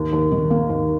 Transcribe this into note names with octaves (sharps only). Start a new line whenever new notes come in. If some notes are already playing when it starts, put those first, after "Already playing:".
Already playing: D#2
D#2
D#3
A#3
D#2